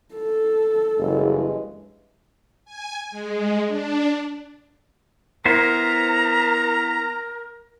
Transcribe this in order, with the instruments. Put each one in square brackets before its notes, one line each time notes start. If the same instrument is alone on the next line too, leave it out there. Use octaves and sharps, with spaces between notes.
[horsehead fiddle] A4
[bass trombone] F#1 [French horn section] G2 E3 G#3
[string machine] G#5
G#3
D4
[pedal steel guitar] B3 E4 C5 [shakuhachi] A#4 [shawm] A#5